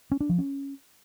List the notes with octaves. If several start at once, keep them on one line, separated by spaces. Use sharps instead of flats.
C#4
D4
F3
C#4